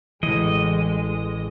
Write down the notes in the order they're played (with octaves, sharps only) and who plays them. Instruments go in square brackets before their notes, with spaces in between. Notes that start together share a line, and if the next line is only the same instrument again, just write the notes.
[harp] A1 C#3 C#7 [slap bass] E3 [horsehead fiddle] G#3 [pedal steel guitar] D#5